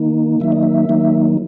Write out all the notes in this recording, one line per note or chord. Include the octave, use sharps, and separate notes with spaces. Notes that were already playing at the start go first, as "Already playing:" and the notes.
Already playing: D#3 A#3 D#4
D#3 F#3 A#3 D#4 E5
D#5
E5
D#3 F#3 A#3 D#4